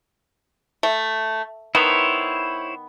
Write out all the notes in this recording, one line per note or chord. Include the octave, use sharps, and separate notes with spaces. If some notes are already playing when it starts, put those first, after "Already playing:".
A3
D#3 B3 E4 C5 C#5